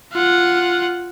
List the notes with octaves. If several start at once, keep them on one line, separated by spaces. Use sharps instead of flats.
F4 F#5